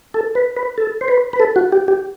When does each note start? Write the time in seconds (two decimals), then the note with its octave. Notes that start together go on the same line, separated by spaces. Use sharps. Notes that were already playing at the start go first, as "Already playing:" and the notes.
0.14 A4
0.35 B4
0.56 B4
0.78 A4
1.01 C5
1.08 B4
1.33 B4
1.40 A4
1.56 F#4
1.72 G4
1.88 G4